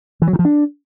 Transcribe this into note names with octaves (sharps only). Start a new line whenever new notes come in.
E3
F#3
D#3
F3
D4